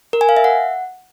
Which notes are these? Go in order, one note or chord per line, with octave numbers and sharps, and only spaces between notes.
A#4
G#5
F5
E5
F#5